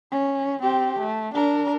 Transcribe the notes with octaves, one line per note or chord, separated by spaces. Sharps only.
C#4
C4 G4
A3
D4 A#4